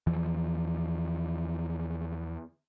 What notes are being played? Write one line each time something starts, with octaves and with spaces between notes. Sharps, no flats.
E2 E3 F3